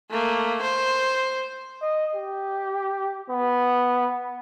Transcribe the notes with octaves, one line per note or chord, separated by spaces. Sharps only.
A3 A#3
C5
D#5
G4
B3